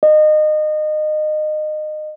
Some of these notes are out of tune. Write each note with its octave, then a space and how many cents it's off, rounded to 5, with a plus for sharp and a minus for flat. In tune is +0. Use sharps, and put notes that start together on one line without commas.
D#5 -25